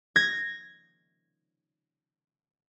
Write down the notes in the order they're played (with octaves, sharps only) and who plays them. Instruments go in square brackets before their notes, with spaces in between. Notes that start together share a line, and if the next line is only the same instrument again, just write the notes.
[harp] G#6 A#6